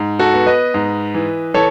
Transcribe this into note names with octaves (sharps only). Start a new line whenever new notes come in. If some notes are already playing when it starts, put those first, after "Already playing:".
Already playing: G#2
F#4 A4
B3
B4 D#5
G#2
E3
E3 A4 C#5